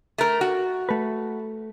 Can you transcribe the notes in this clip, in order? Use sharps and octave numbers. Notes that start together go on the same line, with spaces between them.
A3 A#4
F#4
A3 B4